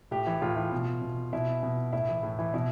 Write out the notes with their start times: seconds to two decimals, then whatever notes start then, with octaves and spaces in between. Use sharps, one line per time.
0.11 A2 G4
0.27 E3
0.42 A2 F4
0.57 E3
0.72 B2
1.02 B2
1.33 B2 E4
1.63 B2
1.93 A2 E4
2.09 E3
2.23 A2
2.39 E3
2.54 B2 E4